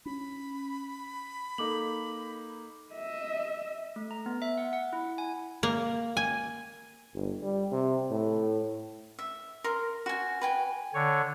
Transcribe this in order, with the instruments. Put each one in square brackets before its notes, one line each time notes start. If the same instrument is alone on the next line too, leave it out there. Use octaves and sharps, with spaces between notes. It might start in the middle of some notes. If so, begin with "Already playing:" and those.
[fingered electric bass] C#4 [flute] B5
[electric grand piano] A#3 D#4 [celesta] A4 D6 F#7
[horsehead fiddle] D#5 E5
[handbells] A3
A#5
B3
E5
F#5
F#5
E4
G#5
[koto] A#3
G#5
[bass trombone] G1
G3
C3
A2
[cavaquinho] E5
A#4 C6
F#4 G#5
B4 G5 G#5
[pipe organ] D3 C#5